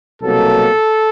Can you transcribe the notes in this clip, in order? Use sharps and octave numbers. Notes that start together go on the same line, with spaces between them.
C2 B2 F#3 A#3 A4